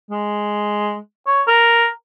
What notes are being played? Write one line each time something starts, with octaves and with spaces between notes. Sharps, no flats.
G#3
C#5
A#4